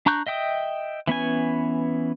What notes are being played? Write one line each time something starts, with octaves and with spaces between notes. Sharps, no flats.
D4 A#5 C#6 F#6 G6
D#5 E5 G5 D#6
E3 B3 C#4 G#5